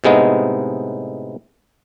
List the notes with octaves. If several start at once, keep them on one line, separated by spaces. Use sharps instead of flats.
A2 C3 G#3 B3 D#4